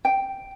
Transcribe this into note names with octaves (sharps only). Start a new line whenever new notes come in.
G5